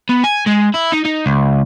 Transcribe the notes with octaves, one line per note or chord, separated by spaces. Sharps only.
B3
G#5
G#3
E4
D#4
D#4
C#2